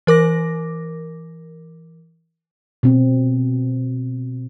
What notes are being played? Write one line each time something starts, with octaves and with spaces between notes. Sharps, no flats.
E3 A#4 D6 A#6
B2 C4